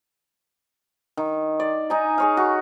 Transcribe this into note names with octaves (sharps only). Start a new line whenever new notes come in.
D#3
D5
D#4 G#5 A#5
G#4 C#5 F5
F#4